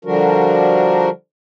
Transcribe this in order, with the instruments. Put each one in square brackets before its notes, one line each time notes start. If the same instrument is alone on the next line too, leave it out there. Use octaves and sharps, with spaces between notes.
[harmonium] D3 F3 G3 D4 F#4 A#4